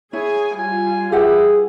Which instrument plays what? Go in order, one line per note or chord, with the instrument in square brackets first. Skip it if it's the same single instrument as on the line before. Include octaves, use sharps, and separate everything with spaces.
[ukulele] E4 [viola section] G#4 G#5 [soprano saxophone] C#5
[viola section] G3 F4 [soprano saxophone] G#5
[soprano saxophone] E4 [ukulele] G4 B4 F#5 [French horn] G#4